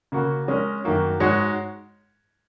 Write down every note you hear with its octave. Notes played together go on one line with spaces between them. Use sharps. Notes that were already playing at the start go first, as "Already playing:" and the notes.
C#3 A#3 F#4
G#3 C#4 A#4
F#2 D#3 A#3 F#4
G#2 G#3 F#4 C#5